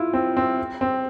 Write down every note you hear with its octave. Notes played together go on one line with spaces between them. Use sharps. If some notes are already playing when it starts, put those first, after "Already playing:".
Already playing: E4 F4
C4
C4
C4